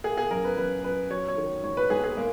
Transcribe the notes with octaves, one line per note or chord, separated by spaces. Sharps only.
A#3 G#4
G#4
F#2 A#4
B4
F#2 B4
F#2 B4
F#3 C#5
C#5
D#3
G#2 C#5
B4
G#2 G#4
G#4
G#3 A#3